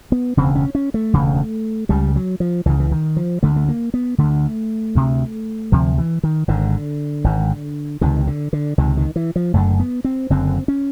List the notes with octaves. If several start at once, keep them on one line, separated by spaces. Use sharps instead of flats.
B3
E1 D2 C#3 C4
C#4
C#4
A3
E1 D2 C#3
C#2 C#3 G3
F#3
F3
C#2 C#3 E3
E3
D#3
F3
D2 D3 A3
A3
A#3
B3
D2 D3 A3
D2 C3
D2 C3 F3
E3
D#3
G#1 G#2 D3
G#1 G#2
C#2 C3 D#3
D3
D3
C#2 C3 D#3
D#3
E3
F3
F#1 F#2 D3 A3
B3
C4
F#1 F#2 D3 C4
C#4